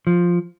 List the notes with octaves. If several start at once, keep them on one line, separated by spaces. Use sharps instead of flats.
F3